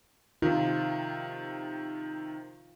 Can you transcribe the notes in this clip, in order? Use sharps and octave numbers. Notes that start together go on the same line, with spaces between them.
C3 D#3 F4